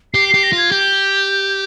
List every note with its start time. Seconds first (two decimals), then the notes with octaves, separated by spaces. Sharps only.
0.14 G4 C7
0.29 C7
0.34 G4
0.43 A#6
0.53 F4
0.58 G#6
0.72 G4 G6